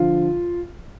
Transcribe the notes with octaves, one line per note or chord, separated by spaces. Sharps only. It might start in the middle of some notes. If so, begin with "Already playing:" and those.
Already playing: D3 F3 F4